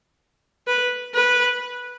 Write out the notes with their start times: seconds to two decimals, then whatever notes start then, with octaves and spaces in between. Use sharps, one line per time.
0.67 B4
1.14 B4